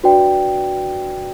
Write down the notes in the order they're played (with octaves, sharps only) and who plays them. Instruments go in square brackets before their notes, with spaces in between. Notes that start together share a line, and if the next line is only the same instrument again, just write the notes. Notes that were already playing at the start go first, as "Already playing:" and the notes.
[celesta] D4 F#4 B4 D5 G5